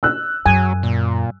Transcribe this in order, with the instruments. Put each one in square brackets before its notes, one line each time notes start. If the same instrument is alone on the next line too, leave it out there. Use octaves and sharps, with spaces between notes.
[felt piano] E6 F#6
[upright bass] F#2 [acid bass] F#3 [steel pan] G#5
[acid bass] A#2